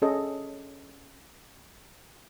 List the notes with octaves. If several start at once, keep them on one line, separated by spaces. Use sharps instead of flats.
C#4 G#4 A4 D#5